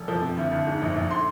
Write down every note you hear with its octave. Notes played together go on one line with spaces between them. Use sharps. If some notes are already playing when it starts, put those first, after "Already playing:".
Already playing: F1
F3
C3
D2
D2
G#2
A#1
A#1
C6